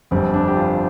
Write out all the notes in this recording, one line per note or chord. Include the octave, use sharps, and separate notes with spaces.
G1 F2 D3 G3 C4
D4
G4
F4